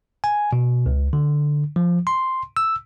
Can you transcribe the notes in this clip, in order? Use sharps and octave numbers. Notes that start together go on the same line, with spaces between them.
G#5
B2
C#2
D3
F3
C6
E6